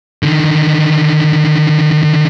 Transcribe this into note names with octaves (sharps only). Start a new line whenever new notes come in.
D3 D#3